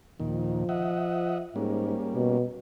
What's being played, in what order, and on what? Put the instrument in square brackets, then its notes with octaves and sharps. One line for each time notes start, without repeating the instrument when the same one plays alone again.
[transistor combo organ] D#2 A#2 D#3 [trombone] F3
[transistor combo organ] D#5 E5 F#5
[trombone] G#2 [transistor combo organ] G3 A#3 C#4
[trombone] B2